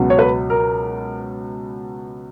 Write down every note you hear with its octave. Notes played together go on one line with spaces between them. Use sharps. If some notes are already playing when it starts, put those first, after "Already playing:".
Already playing: C#2 B2 F#3 B3
C#5
B4
A#4